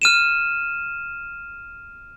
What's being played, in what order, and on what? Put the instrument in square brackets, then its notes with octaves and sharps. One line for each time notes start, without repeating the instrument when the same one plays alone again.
[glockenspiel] F6 D#7 E7